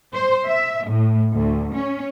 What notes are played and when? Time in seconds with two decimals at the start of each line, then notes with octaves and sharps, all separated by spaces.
0.14 C5
0.48 E5
0.88 A2
1.35 D2
1.75 C#4